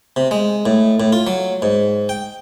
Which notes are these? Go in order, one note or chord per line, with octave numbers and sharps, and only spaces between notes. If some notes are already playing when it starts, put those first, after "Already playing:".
C3
G#3
A2
A2
F4
F#3
G#2
G5